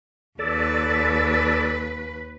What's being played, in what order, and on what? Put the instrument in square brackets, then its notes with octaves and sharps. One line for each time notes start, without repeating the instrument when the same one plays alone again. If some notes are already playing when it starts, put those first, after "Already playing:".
[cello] D#2 B4 [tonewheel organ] A4 D5